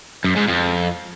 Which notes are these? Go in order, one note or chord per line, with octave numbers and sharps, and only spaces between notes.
F#2
G#2
F2